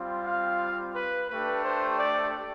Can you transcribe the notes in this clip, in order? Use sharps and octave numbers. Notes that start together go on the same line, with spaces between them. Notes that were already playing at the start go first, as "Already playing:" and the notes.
Already playing: G3 C4 F4
F5
B4
A3 D4 G4 B4
C5
D5